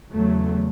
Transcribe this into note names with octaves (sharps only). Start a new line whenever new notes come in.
E2 C#3 F#3 A3